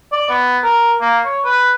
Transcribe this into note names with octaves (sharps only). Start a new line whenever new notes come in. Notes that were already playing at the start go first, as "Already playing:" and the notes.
D5
B3
A#4
A#3
C#5
B4